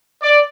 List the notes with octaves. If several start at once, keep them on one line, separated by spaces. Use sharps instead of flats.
D5